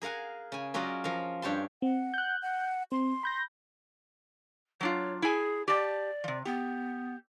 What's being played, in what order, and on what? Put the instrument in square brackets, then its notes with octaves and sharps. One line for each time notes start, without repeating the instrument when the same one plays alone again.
[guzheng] G#4 A#4 F5 F#5 G#5
C#3 G#5
F#3 C#4 F4 F#4 D5 D#5
F3 A#4 F5
G2 C#5 G5 A5 C6
[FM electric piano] C4 [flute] F#5
[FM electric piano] F#6 G6
[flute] F#5
[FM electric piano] C4 [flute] C6
[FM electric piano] B5 G6 A#6
[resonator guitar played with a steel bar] F#3 D4 F4 [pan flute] C#5
[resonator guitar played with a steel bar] E4 G#5 [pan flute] G#4
[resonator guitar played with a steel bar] G4 A5 [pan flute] D5
[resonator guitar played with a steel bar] C3 F3
[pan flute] B3 [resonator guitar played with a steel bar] G4